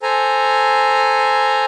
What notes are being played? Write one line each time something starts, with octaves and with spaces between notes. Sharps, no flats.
A4 C5 G#5 A#5